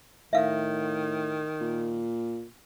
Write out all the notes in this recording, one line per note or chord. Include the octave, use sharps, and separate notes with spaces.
A2 D#3 E5 F5
A#2